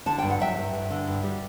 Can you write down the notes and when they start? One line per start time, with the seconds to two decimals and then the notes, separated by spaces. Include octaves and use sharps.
0.06 D3 A5
0.18 G2 G5
0.30 F#5
0.40 F#3 E5 G5
0.57 G2
0.73 G2
0.90 D3
1.07 G2
1.23 G3